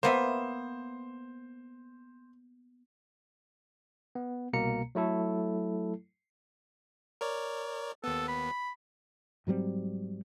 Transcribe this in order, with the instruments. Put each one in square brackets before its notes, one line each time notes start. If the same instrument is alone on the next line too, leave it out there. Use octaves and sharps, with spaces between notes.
[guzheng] A#3 B3 E5 [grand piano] C5
[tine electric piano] B3
C2 B2 A#3 A#5 C#7
F#3 A3 E4 A4
[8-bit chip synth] A#4 C#5 D5
[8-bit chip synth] D#2 B3 [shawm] A4
[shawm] B5
[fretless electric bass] G#2 F#3 G3 C4